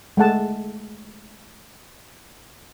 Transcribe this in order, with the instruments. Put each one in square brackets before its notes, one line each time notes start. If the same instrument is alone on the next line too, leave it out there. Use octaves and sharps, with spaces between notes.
[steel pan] G#3 A3 F#5 A5